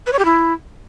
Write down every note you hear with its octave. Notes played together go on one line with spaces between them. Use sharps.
B4
C#5
G4
E4